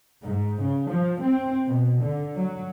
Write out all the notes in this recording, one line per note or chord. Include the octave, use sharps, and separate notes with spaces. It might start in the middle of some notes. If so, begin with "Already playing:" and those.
G#2
C#3
F3
C4
B2
D3
F#3